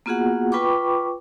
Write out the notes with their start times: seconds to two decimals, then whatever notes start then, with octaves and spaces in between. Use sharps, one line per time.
0.06 A#3 B3 F4 F#4 G#4 F#5
0.52 F4 B4 G5 B5 C#6 D6